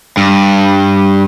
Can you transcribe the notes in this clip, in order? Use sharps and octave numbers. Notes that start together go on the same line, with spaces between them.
G2